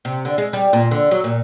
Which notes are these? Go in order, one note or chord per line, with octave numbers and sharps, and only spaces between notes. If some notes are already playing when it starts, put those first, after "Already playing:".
C3
D3
G#3
G3
A#2
D3
F#3
A#2